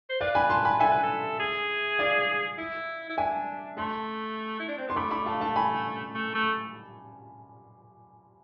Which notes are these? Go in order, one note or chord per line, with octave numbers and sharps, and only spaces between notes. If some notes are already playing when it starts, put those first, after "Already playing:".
C5
B4 D5 F5
G#5 B5
A5 C6
G#5 B5
A4 E5 G#5
B4
A4
G#4
D5 F5
E4
E4
D4 E5 G#5
A3 A5 C6
E4
D4
C4
B3 C6
A3 B5 D6
B5 D6
F5 A5
F5 A5
G#5 B5
A3
A3